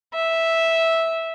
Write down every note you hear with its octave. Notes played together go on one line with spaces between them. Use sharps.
E5